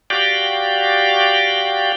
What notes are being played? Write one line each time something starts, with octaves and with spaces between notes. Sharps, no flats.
F#4 G4 D5 F5 G5